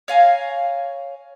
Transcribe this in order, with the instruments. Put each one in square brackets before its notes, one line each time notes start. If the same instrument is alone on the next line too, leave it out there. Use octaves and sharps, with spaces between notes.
[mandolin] C#5 F5 G#5 A#5